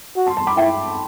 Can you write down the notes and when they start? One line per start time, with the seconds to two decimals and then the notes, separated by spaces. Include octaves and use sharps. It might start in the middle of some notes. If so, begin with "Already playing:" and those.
0.16 F#4
0.26 A5 C6
0.37 A5 C6
0.47 B5 D6
0.57 E4 E5 G5